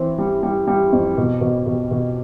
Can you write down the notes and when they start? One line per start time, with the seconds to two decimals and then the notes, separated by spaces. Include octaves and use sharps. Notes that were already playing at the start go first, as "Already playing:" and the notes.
Already playing: E3 C4
0.18 G3
0.43 G3
0.67 G3
0.93 F2
1.17 B2
1.41 B2
1.66 B2
1.91 B2